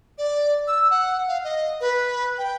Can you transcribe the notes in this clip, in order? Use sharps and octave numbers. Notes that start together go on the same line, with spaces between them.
D5
E6
F#5
F5
D#5
B4
G5